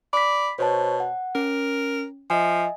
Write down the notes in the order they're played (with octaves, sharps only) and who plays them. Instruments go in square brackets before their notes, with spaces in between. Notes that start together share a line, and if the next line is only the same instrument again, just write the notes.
[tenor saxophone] D5 [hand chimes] B5 B6
[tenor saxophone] B2 [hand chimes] C5 C#5 A5
[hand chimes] F#5
[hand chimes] C#4 [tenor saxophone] A#4
[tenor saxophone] F3 [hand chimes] D#5 E5 G#5